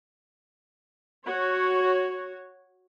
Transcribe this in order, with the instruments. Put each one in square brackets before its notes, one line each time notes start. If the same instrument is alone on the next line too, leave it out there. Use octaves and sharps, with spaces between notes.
[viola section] F#4 C#5